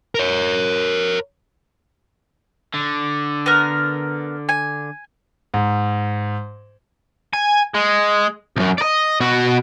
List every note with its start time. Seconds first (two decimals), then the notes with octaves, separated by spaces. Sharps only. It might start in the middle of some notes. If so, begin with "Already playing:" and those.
0.15 A#4 C#5
2.74 D3
3.46 B3 A#4
4.49 G#5
5.54 G#2
7.33 G#5
7.74 G#3
8.56 C2 F#2
8.78 D5 D#5
9.20 B2 F#4